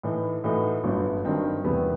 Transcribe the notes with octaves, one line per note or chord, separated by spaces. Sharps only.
A2 E3 A3 D#4
A2 E3 A3 D#4 F#4
G1 F#2 F#3 B3
G2 D#3 F#3 C4 D#4
E1 E2 C3 F#3 B3